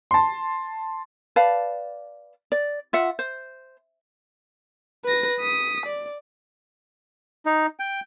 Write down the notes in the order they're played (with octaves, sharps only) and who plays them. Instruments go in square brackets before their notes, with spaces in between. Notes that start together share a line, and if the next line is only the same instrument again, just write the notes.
[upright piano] A5 C6
[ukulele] B4 D5 F5 A5
D5
F4 E5 F#5
C5
[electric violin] B4 A#6
D#6 B6
D5
[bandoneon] D#4
G5